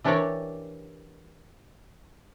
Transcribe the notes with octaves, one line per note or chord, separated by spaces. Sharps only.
E3 D4 G4 A#4 C#5 D5